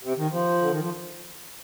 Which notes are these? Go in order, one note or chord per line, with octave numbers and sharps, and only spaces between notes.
C3
D#3
F3
D3
D#3
F3